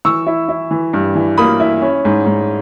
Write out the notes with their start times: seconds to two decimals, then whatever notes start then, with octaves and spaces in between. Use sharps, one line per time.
0.05 E3 C#6 E6
0.27 E4
0.49 E4
0.71 E3
0.93 G2
1.15 E3
1.37 A#3 B5 D#6
1.60 E4
1.81 C#4
2.05 G#2
2.26 G#2